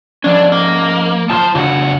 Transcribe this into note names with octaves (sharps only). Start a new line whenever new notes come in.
F3 C#4 D4
A#3
B1 F4 C5 A5
F2 C#3 D4 F#4 F#5